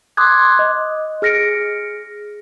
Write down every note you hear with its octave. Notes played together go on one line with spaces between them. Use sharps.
C6 D6 D#6 F#6 G#6
D#5
G#4 F6 A#6 C#7 D7